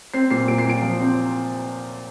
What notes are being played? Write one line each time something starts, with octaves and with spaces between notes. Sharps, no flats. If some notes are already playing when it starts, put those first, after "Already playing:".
C4 C7
A#2 C7
A#2 D7
C7
A#2 D7
F3
C4